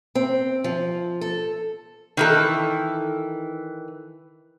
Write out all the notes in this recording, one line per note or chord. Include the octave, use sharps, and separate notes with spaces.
C4
F3
A4
D#3 E3 A4